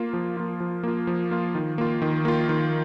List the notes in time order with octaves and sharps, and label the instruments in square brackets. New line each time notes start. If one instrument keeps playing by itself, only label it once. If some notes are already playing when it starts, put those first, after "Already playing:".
Already playing: [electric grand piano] A#3 F4
F3
A#3 F4
F3
A#3 F4
F3
A#3 F4
D#3
A#3 F4
D#3
A#3 F4
D#3